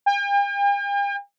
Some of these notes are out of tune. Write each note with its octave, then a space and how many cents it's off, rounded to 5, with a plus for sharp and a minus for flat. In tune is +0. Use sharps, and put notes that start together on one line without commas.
G5 +45